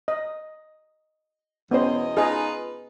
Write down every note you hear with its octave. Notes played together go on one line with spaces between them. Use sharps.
D#5
E2 B3 C#4 C5 D#5
D#4 F4 G#4 B4 D#5